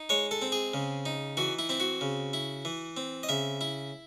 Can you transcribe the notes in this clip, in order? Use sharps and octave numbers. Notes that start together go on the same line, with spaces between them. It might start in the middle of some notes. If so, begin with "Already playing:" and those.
Already playing: D#4
G#3 C#5
A4
C4
G#4
C#3
D#4
E3 F#4
E4
C4 E4
F#4
C#3
E4
E3
C4
D#5
C#3 E5
E4